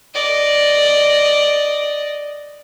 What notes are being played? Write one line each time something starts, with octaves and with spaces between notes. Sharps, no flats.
D5 D#5